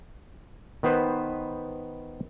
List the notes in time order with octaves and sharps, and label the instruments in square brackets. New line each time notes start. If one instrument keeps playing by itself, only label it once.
[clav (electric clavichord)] D#3 B3 B4 C5